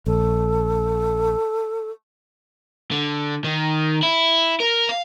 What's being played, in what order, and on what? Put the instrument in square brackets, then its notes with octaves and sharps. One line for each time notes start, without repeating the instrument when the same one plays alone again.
[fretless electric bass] A#1 [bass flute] A4
[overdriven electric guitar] D3
D#3
E4
A#4
F5